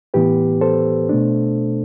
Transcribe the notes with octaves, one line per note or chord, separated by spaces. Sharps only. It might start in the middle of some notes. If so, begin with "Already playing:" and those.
A2 E3 B3 G4 B4
A4 C5
B2 A3 D4